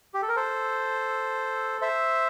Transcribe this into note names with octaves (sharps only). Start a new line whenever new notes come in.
G4
A4
A#4
A4 C5
C5 E5